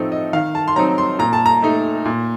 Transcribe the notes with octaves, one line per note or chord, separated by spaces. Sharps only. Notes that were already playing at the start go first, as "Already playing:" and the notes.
Already playing: A2 F3 C4 D#4 A4
D#5
D#3 F5
A5
C6
F#3 C4 D#4 A#5
C6
A#2 A#5
A5
A#5
A3 D#4
A#2